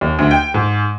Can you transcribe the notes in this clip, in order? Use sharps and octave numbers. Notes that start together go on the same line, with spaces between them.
D#2
D2
G5
G#2